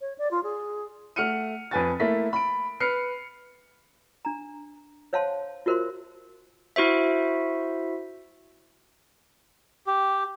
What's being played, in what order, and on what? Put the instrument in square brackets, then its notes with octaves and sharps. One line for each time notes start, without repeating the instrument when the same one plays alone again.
[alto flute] C#5
D5
F4
G#4
[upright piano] A3 F#5 F6 C#7 D#7
F2 B4 G#5 A6
A3 A#3 E4 B6
B5 D7
B4 F6 C7 C#7
[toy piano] D4 A#5
C5 C#5 F5 F#5 A5 C6
F4 F#4 A#4 C5 E5 C6
[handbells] E4 F#4 C5 E5
[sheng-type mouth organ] G4